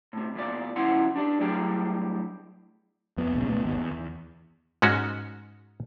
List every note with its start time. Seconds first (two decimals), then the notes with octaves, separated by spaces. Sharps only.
0.13 A2 C3
0.35 E2 A#2 D5
0.76 F2 C#3 C#4 E4 F#5 C6
1.16 D4 G4 D5
1.40 A2 F#3 G3 G#4 G5
3.18 F2 B3
3.33 E1 A#1 E2 C#3
3.48 C#2 B2 A3 B3
3.64 G#1 D#2 B2
3.77 E2
3.91 E2
4.82 G#2 G#3 C#4 F#4